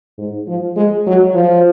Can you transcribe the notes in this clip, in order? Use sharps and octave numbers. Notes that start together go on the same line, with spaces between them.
G#2
F3
G#3
F#3
F3